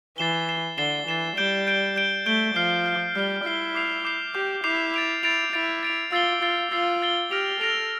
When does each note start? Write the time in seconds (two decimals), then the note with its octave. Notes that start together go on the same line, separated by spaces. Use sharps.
0.18 E3 A6 C7 E7 G7
0.48 A6 C7 E7 G7
0.78 D3 A6 C7 E7 G7
1.08 E3 A6 C7 E7 G7
1.37 G3 G6 D7 G7
1.67 G6 D7 G7
1.96 G6 D7 G7
2.26 A3 G6 D7 G7
2.55 F3 F6 C7 G7
2.86 F6 C7 G7
3.15 G3 F6 C7 G7
3.44 E4 F6 C7 G7
3.75 D6 G6 C7 F7
4.05 D6 G6 C7 F7
4.34 G4 D6 G6 C7 F7
4.64 E4 D6 G6 C7 F7
4.94 A6 D7 F7
5.23 E4 A6 D7 F7
5.53 E4 A6 D7 F7
5.83 A6 D7 F7
6.12 F4 E6 A6 C7 G7
6.42 F4 E6 A6 C7 G7
6.72 F4 E6 A6 C7 G7
7.02 E6 A6 C7 G7
7.31 G4 F6 A#6 D7 F7
7.61 A4 F6 A#6 D7 F7